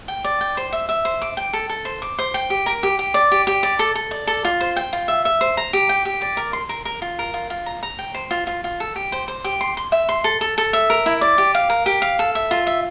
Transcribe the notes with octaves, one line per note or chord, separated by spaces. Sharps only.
G5
D5
G5
C5
E5
E5
C5
D6
G5
A4
A4
C5
D6
C5
G5
G4
A#4
G4
G4
D5
G4
G4
D5
A4
A4
D5
A4
F4
C5
G5
F4
E5
E5
C5
A#5
G4
G5
G4
D5
A#4
C6
A#4
A#4
F4
A#4
F4
F4
A#5
A#5
G5
C5
F4
F4
F4
A4
G4
C5
C5
G4
C6
C6
E5
C6
A4
A4
A4
E5
A#4
E4
D5
G4
F5
A#4
G4
F5
A4
E5
F4
E5